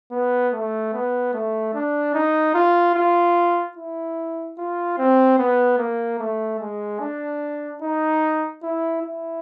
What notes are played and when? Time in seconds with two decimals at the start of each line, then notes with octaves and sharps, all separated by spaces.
0.11 B3
0.53 A3
0.93 B3
1.33 A3
1.74 D4
2.14 D#4
2.55 F4
2.95 F4
3.77 E4
4.58 F4
4.98 C4
5.39 B3
5.78 A#3
6.19 A3
6.60 G#3
7.00 D4
7.82 D#4
8.63 E4
9.02 E4